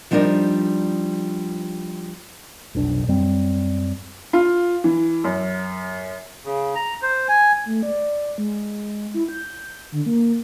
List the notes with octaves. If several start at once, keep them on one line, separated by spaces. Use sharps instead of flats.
F3 G3 D4 D#4 A#4
F1 B1 D4
F#2 G3 C4
F4
E3
F#2
C#3
A#5
C5
G#5
A3
D5
G#3
E4
G6
D3
A#3